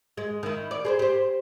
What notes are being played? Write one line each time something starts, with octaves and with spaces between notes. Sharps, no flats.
G#3
D#3 E4
D5
G#4 B4 C5
G4 C5